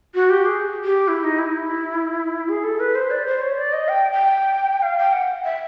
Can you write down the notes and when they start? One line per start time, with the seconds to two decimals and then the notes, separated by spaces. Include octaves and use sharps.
0.15 F#4
0.30 G4
0.46 G#4
0.85 G4
1.08 E4
1.24 D#4
1.39 E4
2.49 G#4
2.64 A4
2.80 B4
2.95 C5
3.11 D5
3.26 C5
3.42 C#5
3.58 D5
3.73 D#5
3.89 G5
4.12 G5
4.82 F5
4.98 G5
5.13 F#5
5.45 E5